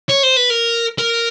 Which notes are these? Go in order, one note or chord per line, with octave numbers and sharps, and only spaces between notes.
C#5
C5
B4
A#4
A#4